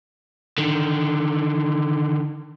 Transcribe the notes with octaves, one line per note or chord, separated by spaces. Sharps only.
D3 D#3